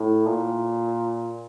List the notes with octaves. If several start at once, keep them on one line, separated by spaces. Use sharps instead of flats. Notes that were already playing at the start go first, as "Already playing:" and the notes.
Already playing: A2
A#2